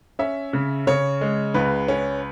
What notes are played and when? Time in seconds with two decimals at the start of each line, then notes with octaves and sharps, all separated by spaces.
0.19 C#4 E5
0.53 C#3
0.87 C#3 C#5
1.21 G#3
1.54 C#2 B4
1.88 C#4